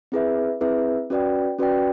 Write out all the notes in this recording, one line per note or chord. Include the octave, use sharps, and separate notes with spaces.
C4 E4 G#4 B4 E5
C4 E4 G#4 B4 E5
C#4 F#4 B4 D5 G5
C#4 F#4 B4 D5 G5